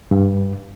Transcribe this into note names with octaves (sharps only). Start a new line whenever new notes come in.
G2